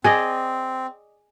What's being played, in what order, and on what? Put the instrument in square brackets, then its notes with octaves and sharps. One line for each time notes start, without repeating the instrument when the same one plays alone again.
[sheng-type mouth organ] C4 [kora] G#4 D5 D#5 [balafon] G#5